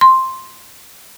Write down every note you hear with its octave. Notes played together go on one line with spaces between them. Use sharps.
C6